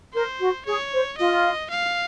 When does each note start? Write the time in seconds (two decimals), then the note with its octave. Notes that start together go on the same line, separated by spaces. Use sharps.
0.14 A#4 C5
0.40 F#4
0.65 G#4 C#5
0.92 C5
1.18 F4 D#5
1.70 F5